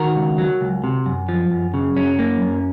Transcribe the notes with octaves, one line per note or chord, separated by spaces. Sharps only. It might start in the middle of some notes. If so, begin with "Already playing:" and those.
Already playing: D#3 F#4 A#4
C#2
F#3
C#2
C3
F#2
F3
F#2
C#3
F#2 C#4
A#3
F#2